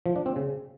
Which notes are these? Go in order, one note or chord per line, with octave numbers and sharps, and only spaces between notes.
F3
D4
C4
C#3